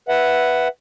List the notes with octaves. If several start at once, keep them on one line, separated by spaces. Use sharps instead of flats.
B4 E5 F#5